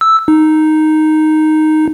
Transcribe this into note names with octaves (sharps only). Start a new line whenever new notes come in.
E6
D#4